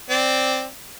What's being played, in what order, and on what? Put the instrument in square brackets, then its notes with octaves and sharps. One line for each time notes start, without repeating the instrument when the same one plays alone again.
[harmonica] C4 D5